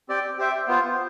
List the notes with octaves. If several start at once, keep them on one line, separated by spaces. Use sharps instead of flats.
C4 G4 D5 G5
G4 C5 E5 G5
B3 F4 C5